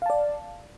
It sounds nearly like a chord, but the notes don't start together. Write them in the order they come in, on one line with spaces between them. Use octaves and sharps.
F5 A5 D5